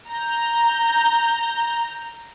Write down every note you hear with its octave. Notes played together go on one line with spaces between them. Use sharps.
A#5 G6